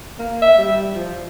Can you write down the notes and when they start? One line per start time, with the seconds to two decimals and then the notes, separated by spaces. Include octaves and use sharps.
0.19 A#3
0.42 E5
0.58 G3
0.95 F3